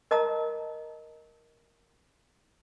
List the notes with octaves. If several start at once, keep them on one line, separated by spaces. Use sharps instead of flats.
A#4 D#5 A5 A#5 D#6